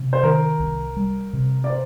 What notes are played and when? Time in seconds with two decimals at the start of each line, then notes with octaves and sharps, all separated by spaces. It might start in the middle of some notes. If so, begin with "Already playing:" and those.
Already playing: C3
0.13 C5
0.23 D#3 A#4
0.60 C2
0.96 G3
1.33 C3
1.64 D5
1.70 C5